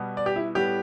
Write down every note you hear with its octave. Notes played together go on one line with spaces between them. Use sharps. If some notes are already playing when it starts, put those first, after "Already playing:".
Already playing: B2 G3 B3
D5
G4
E4
A2 G3 B3 G4